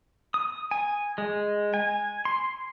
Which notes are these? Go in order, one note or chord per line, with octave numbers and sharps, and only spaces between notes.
D#6
G#5
G#3
G#5
C6